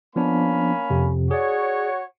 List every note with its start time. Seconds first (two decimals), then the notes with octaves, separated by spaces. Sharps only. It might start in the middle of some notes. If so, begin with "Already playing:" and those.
0.16 F3 A#3 B3 C#4 D4 B5
0.90 F2 C3
1.31 F#4 G#4 C#5 D5